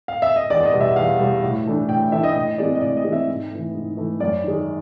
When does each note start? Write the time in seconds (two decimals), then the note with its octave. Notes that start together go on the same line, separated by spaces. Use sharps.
0.08 F5
0.22 E5
0.36 D#5
0.50 E2 D5
0.60 D5
0.65 D#5
0.73 B2 G3
0.81 E5
0.96 E2 F5
1.20 B2 G3
1.43 A2
1.66 E3 A3 D4
1.89 A2 G5
2.12 E3 A3 D4 E5
2.23 D#5
2.35 A2 D#5
2.58 E3 G#3 C4 D5
2.75 D#5
2.81 A2 D5
2.97 D#5
3.05 E3 G#3 C4
3.12 E5
3.28 G#2
3.51 E3 A3
3.75 G#2
3.97 E3 A3
4.20 F#2 D5
4.44 D#3 G#3